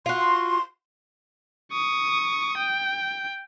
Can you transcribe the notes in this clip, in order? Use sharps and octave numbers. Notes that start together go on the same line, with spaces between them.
F4 F#4 C6
C#6 D#6
G5